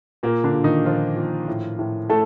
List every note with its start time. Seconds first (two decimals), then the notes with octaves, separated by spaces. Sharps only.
0.23 A#2 A#3
0.44 D3 D4
0.54 A#2
0.64 D#3 D#4
0.85 A#2 F3 F4
1.16 A#2
1.48 A2
1.79 A2
2.09 A2 A3 A4